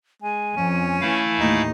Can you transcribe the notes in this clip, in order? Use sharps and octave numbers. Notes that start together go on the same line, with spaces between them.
G#3 G#5
F2 C#4
E3 A3 E4 F5
D#2 A2 D#4